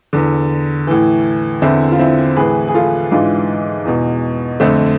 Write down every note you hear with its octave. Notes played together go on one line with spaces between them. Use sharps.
E2 D3
A2 E3
E2 D3 C4 E4
F4
C4 E4
A2 E3 G#4 B4
G#4
F4 A4
G#2 E3 D4 F4
E2 B2
F2 D3 A3 C4